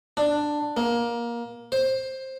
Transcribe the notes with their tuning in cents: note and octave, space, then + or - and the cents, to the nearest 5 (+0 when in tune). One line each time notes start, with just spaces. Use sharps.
D4 +10
A#3 +20
C5 +15